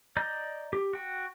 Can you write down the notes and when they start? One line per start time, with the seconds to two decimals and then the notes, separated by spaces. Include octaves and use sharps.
0.17 D5 D#5 A#5 G6
0.73 G4
0.93 F#4 G5